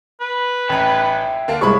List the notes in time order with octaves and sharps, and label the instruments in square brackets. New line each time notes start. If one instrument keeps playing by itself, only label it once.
[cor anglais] B4
[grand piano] A1 A#5 [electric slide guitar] C#5 E5 G5
[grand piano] D3 A#3 D4
[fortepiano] C2 G#3 [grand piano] C#5 B5 C#6